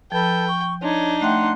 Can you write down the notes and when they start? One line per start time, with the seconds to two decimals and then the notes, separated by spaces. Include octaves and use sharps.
0.12 F3 A4 B4 G5 A5
0.48 C#6
0.82 D4 D#4 C#5 C6
1.21 A3 E5 F#5 G5 C6 F#6